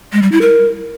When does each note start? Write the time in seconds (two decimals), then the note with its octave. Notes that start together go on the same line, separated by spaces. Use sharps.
0.13 G#3
0.22 G3
0.32 E4
0.41 A#4